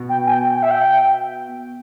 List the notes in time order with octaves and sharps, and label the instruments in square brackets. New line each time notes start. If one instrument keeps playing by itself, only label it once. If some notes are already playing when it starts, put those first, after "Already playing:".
Already playing: [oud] B2 B3
[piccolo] G5
G#5
G5
G5
E5
G5